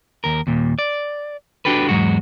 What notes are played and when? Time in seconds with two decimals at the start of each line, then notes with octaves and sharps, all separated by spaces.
0.24 D#2 A#4
0.47 D#2 A#2
0.79 D5
1.65 D4 F#4 G4 A4 B4
1.89 E2 G#2 F#3 G#3 F#4